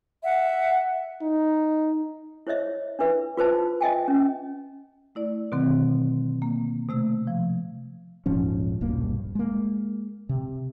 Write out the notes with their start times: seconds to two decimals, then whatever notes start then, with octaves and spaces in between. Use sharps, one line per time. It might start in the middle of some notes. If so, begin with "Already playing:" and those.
0.22 E5 F#5
1.22 D#4
2.47 E4 C5 C#5 D#5 E5
2.99 D4 E4 B4 E5
3.37 F4 B4 C5 A5
3.81 D#5 E5 G5 G#5
4.08 C#4
5.15 A3 E4 D5
5.52 B2 D3 D#3 F#3 C4
6.42 A#3
6.89 C3 A3 E6
7.27 F3
8.26 D#1 G#2 F3 C#4
8.81 D#1 B1 G2 A#3
9.35 G#3 A#3
10.29 C3